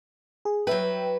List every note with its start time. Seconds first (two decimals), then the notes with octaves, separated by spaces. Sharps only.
0.45 G#4
0.67 F#3 B4 E5 G5